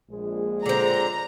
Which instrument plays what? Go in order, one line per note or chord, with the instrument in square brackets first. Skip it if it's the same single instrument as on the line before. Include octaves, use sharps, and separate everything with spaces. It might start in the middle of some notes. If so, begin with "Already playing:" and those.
[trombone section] A#1 G#3
[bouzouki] D3 C4 [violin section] A#5